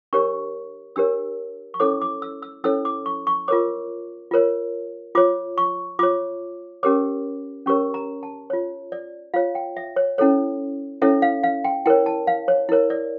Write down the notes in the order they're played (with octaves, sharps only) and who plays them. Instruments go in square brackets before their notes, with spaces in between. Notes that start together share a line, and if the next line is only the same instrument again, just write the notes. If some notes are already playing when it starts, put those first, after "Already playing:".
[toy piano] D4 G4 A#4 C#5 C#6
D4 G4 A#4 C#5 E6
C#6
C#4 E4 A4 C#5 D6
D6
E6
E6
C#4 E4 A4 C#5 E6
D6
C#6
C#6
F4 A#4 C#5 D6
F4 A#4 C#5
F4 C#5 D6
C#6
F4 C#5 D6
C#4 G4 A#4 C#5 D6
C#4 G4 A#4 C#5 C#6
A#5
A5
F4 C#5
D5
F4 C#5 F5
G5
E5
C#5
C#4 E4 A4 C#5
C#4 E4 A4 C#5 E5
F5
F5
G5
E4 A#4 C#5 G5
A5
F5
C#5
E4 A#4 C#5
D5